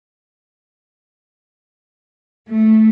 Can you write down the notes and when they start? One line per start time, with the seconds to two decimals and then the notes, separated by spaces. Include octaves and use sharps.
2.50 A3